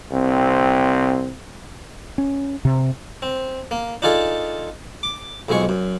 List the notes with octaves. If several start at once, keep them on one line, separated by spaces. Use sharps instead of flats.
C2 C4
C#4
C3
C4
A#3
D4 D#4 F4 G#4 A4
D6
B1 F2 G#3 G#4 C#6
F#2